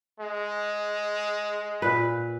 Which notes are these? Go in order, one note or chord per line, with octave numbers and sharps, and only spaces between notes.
G#3
A#2 B4